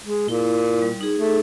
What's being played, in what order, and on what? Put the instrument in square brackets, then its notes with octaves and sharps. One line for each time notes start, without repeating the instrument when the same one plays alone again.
[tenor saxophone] G#3
[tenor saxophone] A#2 [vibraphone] E4
[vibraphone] G3
D#4 G#4
[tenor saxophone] A3